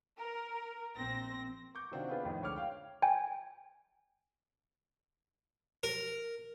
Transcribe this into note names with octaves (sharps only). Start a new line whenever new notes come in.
A#4
A#1 C4 A#6
C#6 D6 G6
C3 D#3 C4 D4 F4 F#4
B3 D4 F4 G#4 B4
F2 A2 D#3
C#2 D3 C#5 D6 F6
F5 G5
G5 G#5
A#4